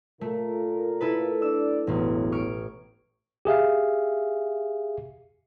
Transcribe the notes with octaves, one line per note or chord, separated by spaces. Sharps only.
A#2 A3 F4 A#4
E4 A4 B4
D4 D5 E6
E1 A1 F#3 B3
C#6 F6 D7
G4 G#4 E5 F5